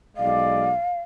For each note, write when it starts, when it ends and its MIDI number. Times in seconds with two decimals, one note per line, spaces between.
0.17 0.70 35
0.17 0.70 56
0.17 0.70 74
0.17 1.01 77